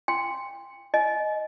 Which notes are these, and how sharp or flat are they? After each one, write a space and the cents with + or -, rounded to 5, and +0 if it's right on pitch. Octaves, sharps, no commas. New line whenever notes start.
G5 +35 C6 -5
D#5 +0 G#5 +35